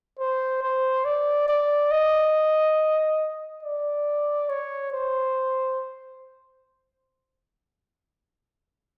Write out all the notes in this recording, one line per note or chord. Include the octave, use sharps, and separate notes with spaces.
C5
C5
D5
D5
D#5
D5
C#5
C5